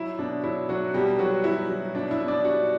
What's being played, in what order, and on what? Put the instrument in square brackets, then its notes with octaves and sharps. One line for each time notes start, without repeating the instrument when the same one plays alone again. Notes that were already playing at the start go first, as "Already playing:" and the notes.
Already playing: [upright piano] F#3 E4
B2 D4
F#3 E4
F#3 F#4
B2 G3 G4
B2 F#3 F#4
F#3 E4
F#3
B2 D4
E4
B2
D4 D5
G3 F#4 F#5